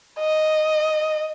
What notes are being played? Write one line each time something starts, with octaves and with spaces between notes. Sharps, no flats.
D#5